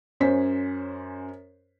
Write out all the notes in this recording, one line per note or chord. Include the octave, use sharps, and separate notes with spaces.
F#2 C#4 C5 B6